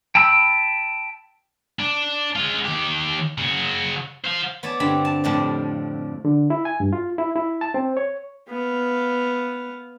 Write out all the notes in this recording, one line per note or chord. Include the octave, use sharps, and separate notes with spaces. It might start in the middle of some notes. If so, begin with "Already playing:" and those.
G5 A5 B5 E6
D4
G#3 F4
D#2 G4
C#3 F#4
C5 F5
B3 C#5 D5 A5
G2 D3 C4 B5
A5
F2 A2 D4
D3
E4
G#5
G2
F4
E4
E4
A5
C4
C#5
B3 F5